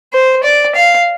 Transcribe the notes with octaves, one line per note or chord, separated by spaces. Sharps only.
C5
D5
F5